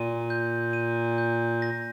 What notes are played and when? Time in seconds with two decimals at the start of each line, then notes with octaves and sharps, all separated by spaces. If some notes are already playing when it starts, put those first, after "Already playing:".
Already playing: A#2 D#7
0.30 G6
0.73 D#7
1.18 G6
1.62 A#6